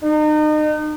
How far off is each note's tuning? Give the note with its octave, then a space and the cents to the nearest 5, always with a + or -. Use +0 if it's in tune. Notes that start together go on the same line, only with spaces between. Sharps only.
D#4 -35